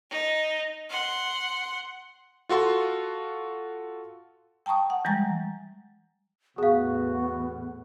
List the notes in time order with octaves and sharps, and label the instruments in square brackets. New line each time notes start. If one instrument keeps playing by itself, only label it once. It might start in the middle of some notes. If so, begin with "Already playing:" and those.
[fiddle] D#4
F#5 C6
[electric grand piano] F4 F#4 A4 C6
[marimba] G5 A5 A#5 C#6 D#6
F#5
E3 G3 G#3 G#5 A#5 A6
[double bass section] E2 A2 [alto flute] B3 [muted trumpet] F#4 [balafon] G#4 F5